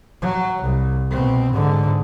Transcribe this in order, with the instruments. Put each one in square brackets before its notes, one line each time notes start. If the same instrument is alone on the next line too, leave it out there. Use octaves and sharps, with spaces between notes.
[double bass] F#3
C2
B2 C4
G#2 D3